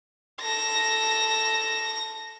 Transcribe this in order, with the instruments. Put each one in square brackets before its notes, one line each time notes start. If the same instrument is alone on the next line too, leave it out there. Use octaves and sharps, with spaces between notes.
[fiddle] A4 [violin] A#6